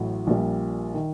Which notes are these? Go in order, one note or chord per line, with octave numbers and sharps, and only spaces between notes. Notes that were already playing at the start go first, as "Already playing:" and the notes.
Already playing: A1 A2 F#3
A#1 A#2 G3
D#3